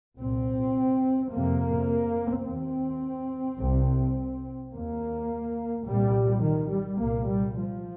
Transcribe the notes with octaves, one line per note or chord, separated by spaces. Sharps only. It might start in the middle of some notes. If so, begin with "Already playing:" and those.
C2 A#2 C4
F2 C3 A#3
D#2 C4
C2 C3
D#2 A#3
C2 A#2 G3
D#3
G3
C2 A#2 A#3
G3
F3